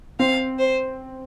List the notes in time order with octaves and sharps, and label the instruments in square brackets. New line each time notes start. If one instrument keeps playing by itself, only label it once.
[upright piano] C4 [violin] F5
[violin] C5